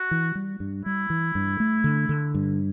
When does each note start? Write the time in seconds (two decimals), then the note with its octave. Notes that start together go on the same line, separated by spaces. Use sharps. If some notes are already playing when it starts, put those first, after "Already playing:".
Already playing: F#4
0.11 E3
0.35 G3
0.60 G2
0.85 G3 E4
1.10 E3
1.35 G2
1.60 A3
1.84 D3
2.09 D3
2.35 G2